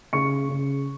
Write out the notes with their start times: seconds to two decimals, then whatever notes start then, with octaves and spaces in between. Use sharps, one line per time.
0.13 C#3 C#6 C#7
0.49 C#3